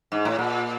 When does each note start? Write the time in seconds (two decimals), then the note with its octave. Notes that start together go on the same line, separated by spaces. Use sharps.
0.12 G#2
0.25 A2
0.39 A#2